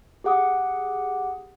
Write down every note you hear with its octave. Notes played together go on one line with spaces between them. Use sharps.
G4 G#4 F#5 D6 D#6